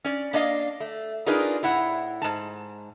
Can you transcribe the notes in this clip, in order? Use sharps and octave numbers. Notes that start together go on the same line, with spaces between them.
C#4 D5
A#3 D4 D#5 F5
A3
D4 D#4 F4 G#4 A#4 B4
A2 E4 F#5
G#2 A5